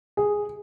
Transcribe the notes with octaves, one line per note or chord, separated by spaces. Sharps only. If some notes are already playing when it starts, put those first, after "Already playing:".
G#4